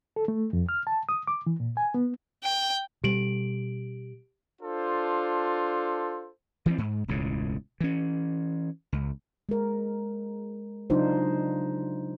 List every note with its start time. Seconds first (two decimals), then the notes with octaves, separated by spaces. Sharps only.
0.16 A4
0.28 A3
0.53 F2
0.69 F6
0.87 A5
1.09 D#6
1.27 D6
1.47 E3
1.60 A#2
1.77 G#5
1.94 B3
2.44 G5
3.04 B2 G3 G4 D7 F#7
4.62 D4 F4 A4 C5
6.66 E3 F3 A#3 C4
6.78 G#2
7.08 E1 C#2 A2 C#3
7.80 E3 C#4
8.92 C#2
9.49 G#3 A#4
10.90 C#3 F#3 D4 D#4 F4 C5